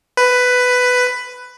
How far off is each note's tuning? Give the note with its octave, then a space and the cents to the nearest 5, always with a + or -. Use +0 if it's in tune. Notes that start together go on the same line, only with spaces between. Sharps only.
B4 +10